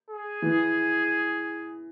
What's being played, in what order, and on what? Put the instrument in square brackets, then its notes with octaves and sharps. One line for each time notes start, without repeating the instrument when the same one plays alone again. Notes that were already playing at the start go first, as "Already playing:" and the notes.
[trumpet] G#4
[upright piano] E3